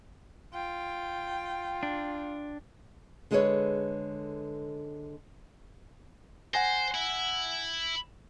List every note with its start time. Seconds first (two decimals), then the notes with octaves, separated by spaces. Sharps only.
0.54 F4 G5
1.83 D4
3.31 D3 G#3 G#4 A4 B4 C#5
6.54 C5 F#5 G#5 A#6
6.94 E4